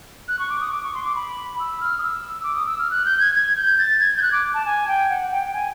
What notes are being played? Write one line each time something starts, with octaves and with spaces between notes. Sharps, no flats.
F#6
C#6
D6
D#6
D6
C#6
C6
D6
B5
E6
F6
D#6
E6
D6
D#6
E6
F6
F#6
G6
G#6
G#6
G6
A6
G#6
G6
F#6
D6
A5
G#5
G5
F#5
G5
G#5